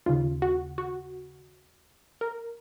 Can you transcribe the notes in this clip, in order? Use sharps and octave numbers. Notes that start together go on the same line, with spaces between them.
D#2 C#3 F4
F#4
F#4
A#4